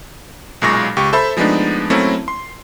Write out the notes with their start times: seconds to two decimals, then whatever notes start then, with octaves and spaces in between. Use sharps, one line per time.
0.62 B1 F#2 A#2 G#3 C#6 A#6
0.97 C#2 G4 C#6
1.13 A4 C5 E5 B5
1.37 F3 G#3 A3 B3 D4 D#4
1.90 F#3 A3 A#3 C4 C#4 E4
2.28 C6